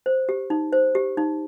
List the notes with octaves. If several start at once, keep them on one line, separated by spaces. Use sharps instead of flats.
C5
G4
D#4
C5
G4
D#4